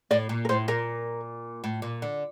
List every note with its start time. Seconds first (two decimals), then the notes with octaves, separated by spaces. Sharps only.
0.11 A2 D5
0.29 A#2
0.45 A#4
0.49 A2 C5
0.68 A#2 A#4
1.64 A2
1.82 A#2
2.02 D3